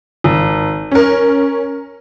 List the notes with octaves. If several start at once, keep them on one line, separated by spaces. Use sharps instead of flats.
G#1
C#4 A#4